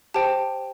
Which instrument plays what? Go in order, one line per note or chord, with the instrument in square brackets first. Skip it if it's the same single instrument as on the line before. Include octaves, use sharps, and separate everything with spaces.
[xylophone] G4 C5 G5 A5